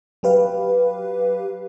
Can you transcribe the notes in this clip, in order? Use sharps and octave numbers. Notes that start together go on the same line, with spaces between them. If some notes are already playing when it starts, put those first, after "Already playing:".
F#3 G4 B4 F5